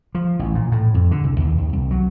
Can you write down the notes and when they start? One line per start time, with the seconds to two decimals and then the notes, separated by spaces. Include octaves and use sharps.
0.15 F3
0.39 A1
0.55 A#2
0.72 A2
0.94 F2
1.11 D3
1.24 C2
1.40 D#2
1.58 D#2
1.73 C2
1.91 F#3